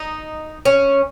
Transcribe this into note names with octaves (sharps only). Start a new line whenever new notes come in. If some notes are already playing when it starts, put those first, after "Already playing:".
Already playing: D#4
C#4